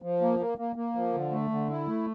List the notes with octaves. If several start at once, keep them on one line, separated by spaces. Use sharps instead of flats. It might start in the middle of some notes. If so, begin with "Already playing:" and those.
F3
A#3
A#3
A#3
A#3
F3
D3
A3
D3
E4
A3